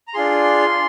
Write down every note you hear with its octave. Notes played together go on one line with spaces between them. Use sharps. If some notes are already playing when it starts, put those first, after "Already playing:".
A#5
D4 F4 G#4 C6